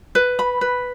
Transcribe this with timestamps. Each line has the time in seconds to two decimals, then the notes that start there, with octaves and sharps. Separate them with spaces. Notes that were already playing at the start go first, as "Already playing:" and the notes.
0.15 B4
0.39 B5
0.61 B4